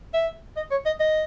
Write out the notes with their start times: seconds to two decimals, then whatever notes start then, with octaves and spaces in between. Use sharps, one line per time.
0.13 E5
0.56 D#5
0.71 C#5
0.86 D#5
1.00 D#5